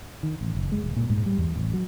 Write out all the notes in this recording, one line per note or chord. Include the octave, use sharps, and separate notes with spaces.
D#3
A1
F#1
G#3
D#1
A#2
G#2
G3
E2
A1
F#3